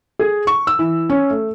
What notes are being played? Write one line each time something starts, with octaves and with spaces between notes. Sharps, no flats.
G#4
C#6
E6
E3
C#4
A3